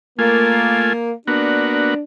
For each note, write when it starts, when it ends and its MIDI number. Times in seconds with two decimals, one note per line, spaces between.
0.19 0.93 57
0.19 1.12 58
0.19 0.93 65
0.19 0.93 80
1.28 1.94 58
1.28 1.94 59
1.28 2.02 62
1.28 1.94 66